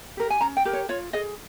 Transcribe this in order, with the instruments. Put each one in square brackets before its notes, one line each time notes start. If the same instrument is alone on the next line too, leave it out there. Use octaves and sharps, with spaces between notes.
[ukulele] G4 A#4
G#5
C#4 A#5
G5
G4 A#4
C#5
F4 C#5
G#4 D#5